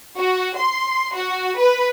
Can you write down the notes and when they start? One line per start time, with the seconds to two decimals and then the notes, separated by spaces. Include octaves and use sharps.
0.18 F#4
0.58 C6
1.15 F#4
1.58 B4